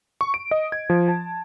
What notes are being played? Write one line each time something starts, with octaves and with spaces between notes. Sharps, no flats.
C#6
D7
D#5
G#6
F3
A5